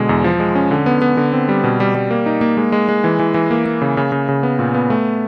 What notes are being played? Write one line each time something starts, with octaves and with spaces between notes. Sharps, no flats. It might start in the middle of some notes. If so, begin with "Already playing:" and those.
Already playing: B2 D3 G#3
E2
F3
G#3
C#4
D3
B3
B3
D3
C4
G3
B2
G3
G3
A#3
D#4
A#3
G#3
G#3
G#3
E3
E3
E3
A#3
A#3
C#3
C#3
C#3
C#3
B3
A#2
B3
A3